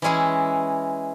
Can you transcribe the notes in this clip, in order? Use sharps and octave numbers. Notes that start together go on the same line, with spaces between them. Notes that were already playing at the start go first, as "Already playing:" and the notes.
E3 G#3 C#4 E4 G#4